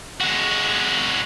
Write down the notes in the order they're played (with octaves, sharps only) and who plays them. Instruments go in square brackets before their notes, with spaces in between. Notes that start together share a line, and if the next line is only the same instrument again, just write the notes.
[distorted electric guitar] G#3 F#4